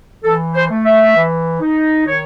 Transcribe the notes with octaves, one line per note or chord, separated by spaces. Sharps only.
E3 A4
C5
A3
E5
E3
D#4
D#3 C#5